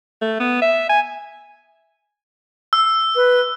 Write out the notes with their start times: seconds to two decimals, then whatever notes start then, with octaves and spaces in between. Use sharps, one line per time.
0.22 A3
0.40 B3
0.62 E5
0.89 G#5
2.73 E6
3.16 B4